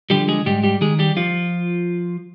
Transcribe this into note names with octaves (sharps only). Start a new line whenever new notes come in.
D3 F3 G3 G4
G#3 G#4
G#2 G3 G4
G3 G4
D#3 G#3 G#4
G3 G4
F3 F4